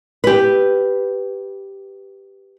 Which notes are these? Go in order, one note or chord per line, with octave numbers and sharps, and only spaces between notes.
G4 B4